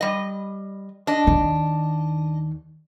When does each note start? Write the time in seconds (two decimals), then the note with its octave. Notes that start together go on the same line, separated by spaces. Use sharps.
0.01 G3 D#5
1.07 D4 D#5
1.27 D#2 D#3